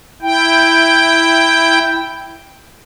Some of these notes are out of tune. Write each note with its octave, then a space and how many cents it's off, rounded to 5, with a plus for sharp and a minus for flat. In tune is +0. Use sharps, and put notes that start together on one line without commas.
E4 +0 G5 +0